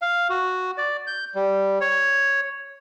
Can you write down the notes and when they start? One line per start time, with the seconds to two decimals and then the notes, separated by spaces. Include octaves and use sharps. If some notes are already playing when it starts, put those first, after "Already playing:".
0.02 F5
0.30 F#4
0.78 D5
1.07 G6
1.35 G3
1.81 C#5